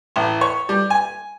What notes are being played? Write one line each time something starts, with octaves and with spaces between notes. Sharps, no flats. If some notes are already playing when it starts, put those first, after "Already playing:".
A1
C#5
G3
G#5